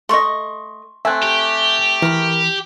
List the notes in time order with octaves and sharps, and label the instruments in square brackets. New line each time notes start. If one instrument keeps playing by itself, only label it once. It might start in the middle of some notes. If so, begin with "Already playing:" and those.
[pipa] A3 D#5 [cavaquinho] C6 C#6
[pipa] A3 C4 [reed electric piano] E5 G#5 F#6
[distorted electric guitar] G4
[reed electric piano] E3 [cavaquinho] A#4 B5